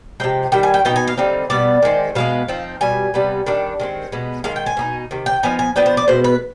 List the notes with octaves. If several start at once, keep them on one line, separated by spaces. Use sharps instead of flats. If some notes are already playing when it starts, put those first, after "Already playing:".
C3 F3 G#3 G5
D#3 G3 G5
G#5
G5
B2 B3 D#4 G5
G#5
F5
D3 G3 C4 D#4
B2 G3 B3 D5
D#3 G#3 C4
B2 G#3 B3 F5
F3 C4 D#4
B2 G3 G#5
C3 G3 B3
D#3 G3 D4
D#3 G#3 C4
B2 G#3 B3
D#3 G#3 F5
G5
G#5
B2 B3 D#4
C3 D#3
G5
F3 B3 D#4 G#5
G#5
F3 B3 D4 G5
C5
D5
B2 G#3 B3 C5
B4